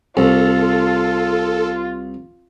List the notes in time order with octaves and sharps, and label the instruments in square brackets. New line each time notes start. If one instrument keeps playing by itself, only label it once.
[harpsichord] C2 [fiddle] F4 [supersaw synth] A4